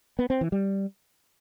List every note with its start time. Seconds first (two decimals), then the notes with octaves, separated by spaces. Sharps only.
0.19 B3
0.30 C4
0.41 E3
0.52 G3